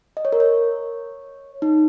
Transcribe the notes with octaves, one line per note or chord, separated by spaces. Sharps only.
D#5
C#5
A#4
C#5
D#4